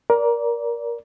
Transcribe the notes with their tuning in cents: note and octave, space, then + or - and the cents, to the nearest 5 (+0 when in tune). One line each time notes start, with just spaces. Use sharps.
A#4 +20 D5 -20